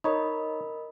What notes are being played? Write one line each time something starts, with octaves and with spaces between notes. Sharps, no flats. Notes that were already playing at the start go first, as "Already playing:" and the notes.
D#4 A#4 C#5 D#5 B5